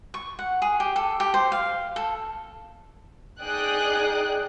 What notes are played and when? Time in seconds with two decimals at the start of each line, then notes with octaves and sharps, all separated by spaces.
0.14 C#6
0.39 F#5
0.62 G#4
0.80 G4
0.96 A4
1.20 G4
1.34 C5
1.52 F5
1.96 A4
3.42 D#4 G#4 D5 G5 D#6 F#6